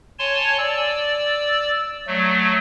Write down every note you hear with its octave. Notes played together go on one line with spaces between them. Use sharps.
C#5 G#5 A5 C6
D5 E6
F#3 A3